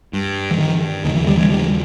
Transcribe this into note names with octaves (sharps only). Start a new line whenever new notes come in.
G2
E3
D#3
D#2 C#3 D#3
E3
D#3 G3
E3 G#3
D#3 G3